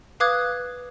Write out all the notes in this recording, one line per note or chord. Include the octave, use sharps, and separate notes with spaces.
B4 F5 D6 D#6 F#6 G#6